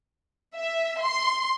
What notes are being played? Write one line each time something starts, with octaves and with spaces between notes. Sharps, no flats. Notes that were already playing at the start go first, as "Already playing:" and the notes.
E5
C6